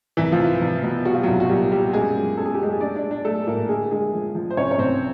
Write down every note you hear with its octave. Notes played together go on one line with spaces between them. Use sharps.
C2 E3 E4
F3 F4
C2
C2
B2
G3 F#4
F4
C2 F#3 F#4
F#4
A#2 G3 G4
G3 G4
F#2 G#3 G#4
F#3
F#2 A4
G#4
G4
F#2 G#3 G#4
G#3 D4 D5
D4 D5
G#3
D4 D5
G#3 A3 A4
A2 A#3 A#4
D3 G#3 G#4
D3 G#3 G#4
F3
F3
C5
C2 C#4 C#5
C#5
C2 C4 C5